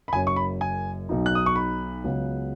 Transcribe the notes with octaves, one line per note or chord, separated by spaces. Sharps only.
B5
F#1 F#2 F#3 C#4 G#5
C#6
B5
G#5
B1 B2 F#3 D#4
F#6
D#6
C#6
B5
C#2 C#3 F#3 B3